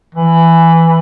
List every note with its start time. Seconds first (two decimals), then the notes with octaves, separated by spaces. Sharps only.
0.15 E3